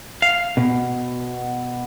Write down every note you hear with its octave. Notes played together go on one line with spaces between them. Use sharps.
F5
B2